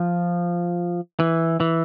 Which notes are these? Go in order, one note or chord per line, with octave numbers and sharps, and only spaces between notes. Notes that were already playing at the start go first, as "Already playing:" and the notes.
Already playing: F3
E3
E3